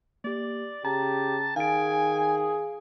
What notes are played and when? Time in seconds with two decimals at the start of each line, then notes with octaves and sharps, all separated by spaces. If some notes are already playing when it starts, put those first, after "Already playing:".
0.24 A#3 G4 D5
0.85 C#3 G4 A5 A#5
1.56 D#3 G#4 F5 G#5 D7